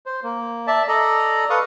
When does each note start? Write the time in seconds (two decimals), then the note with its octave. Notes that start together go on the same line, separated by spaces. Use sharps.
0.06 C5
0.23 A#3
0.67 D5 E5 A5
0.88 A4 D5 D#5 A#5
1.50 A4 B4 F5 C#6 D#6